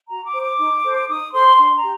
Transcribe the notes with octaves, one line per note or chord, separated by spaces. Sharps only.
F#4 A#5
D6
C5
D6
D#4
A4 C5
D#4 D#6
A4 C5 C6
D4 C6
A#5
G4